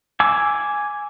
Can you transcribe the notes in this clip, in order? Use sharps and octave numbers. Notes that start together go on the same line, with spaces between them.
G#5 D6 E6